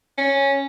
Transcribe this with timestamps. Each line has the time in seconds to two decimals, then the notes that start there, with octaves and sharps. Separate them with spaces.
0.18 C#4